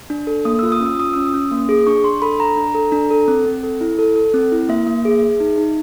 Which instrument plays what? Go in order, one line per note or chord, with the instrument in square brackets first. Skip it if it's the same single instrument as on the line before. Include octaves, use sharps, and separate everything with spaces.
[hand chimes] D4
A4
A#3 D#6
F4 E6
D#6
C#4
E6
F4 D#6
C#4 E6
D#6
C#4
A#3
G#4
D4 C#6
D4 C6
A4 B5
D4 A#5
D4
A4
D4
A4
C4
C4
A4
E4
A4
A4
C4
E4
A#3 E5
A#3
G#4
G#4
D#4
D#4